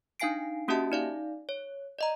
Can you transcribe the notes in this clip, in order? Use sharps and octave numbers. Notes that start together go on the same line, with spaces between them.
D4 D#4 F5 G#5 C7 D7
A#3 C#4 F#4 G4 E5 A5
D#4 D5 F5
C#5
D5 D#5 A#5